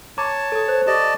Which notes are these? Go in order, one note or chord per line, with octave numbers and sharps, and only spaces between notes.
C#5 A5 A#5 D6
A4 D#6
C5
G4 D5 D#5 A5